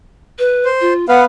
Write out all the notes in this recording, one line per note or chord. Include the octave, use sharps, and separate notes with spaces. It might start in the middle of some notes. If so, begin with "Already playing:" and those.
B4
C5
F4
B3 B4 F5 F#5